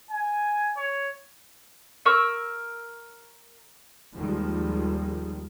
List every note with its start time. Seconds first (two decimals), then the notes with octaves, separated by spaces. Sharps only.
0.11 G#5
0.77 C#5
2.05 A#4 C#6 E6
4.15 D#2 D#3 F3 G3 G#3